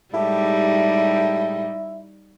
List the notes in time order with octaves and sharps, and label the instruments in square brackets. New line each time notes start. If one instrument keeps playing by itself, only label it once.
[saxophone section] A2 G#3 G4 [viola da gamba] G3 D#4 [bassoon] E4